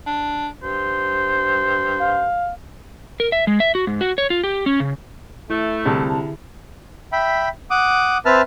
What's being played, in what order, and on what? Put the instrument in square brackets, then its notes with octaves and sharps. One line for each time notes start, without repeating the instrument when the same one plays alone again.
[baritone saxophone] D4
[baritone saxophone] G2 [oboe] C5
[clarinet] F5
[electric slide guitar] A#4
E5
G#3
E5
F#4
G#2
F#4
C#5
F4
G4
C#4
C#3
[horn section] A3 [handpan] E4
[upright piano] C2 A5 [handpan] D3 G#4
[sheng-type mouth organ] E5 G5 B5
F#5 D6 D#6
C4 B4 E5 A5 F6